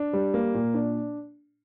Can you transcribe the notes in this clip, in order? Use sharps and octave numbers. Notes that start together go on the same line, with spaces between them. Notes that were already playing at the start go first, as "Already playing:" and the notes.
Already playing: D4
G3
A#3
A#2
D4